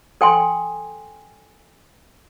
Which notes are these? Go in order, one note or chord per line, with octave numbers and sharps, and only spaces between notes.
A4 G5 G#5 C6